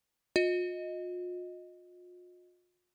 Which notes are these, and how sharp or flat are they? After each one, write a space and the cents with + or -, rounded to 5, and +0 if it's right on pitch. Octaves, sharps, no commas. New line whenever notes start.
F4 +45 D#5 +5